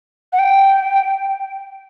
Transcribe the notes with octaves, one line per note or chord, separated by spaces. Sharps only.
F#5
G5